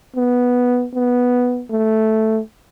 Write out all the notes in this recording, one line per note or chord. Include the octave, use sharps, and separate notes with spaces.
B3
B3
A3